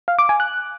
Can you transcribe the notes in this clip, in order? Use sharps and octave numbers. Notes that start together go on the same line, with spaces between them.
F5
D6
G#5
F#6